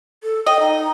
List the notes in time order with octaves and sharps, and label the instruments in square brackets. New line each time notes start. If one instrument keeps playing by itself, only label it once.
[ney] A4
[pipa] D#5 [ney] G5
[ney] D#4